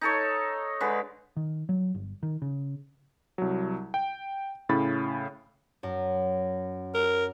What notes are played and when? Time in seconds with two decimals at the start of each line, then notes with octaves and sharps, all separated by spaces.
0.01 D#4 A4 C#5
0.80 D3 G#3 B4
1.37 D#3
1.69 F#3
1.95 G1
2.23 D#3
2.42 C#3
3.38 C2 F#3
3.94 G5
4.69 A2 C#3 C#4 B5 A6
5.83 F#2
6.95 A#4